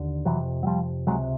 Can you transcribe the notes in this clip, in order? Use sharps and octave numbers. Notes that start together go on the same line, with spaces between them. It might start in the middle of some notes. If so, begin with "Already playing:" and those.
Already playing: D#2 D3
F2 C3 E3 F#3
F#3
F3 G3
C#2 C3 F#3 G#3